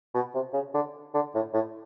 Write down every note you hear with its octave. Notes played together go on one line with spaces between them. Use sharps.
B2
C3
C#3
D3
D3
A2
A2